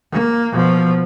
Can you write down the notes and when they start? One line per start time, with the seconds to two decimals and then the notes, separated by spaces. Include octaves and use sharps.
0.11 A#3
0.52 B2 F3